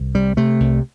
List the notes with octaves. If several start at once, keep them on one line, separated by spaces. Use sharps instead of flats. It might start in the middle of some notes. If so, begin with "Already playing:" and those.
Already playing: C2
C3 G3
C3 A3
C2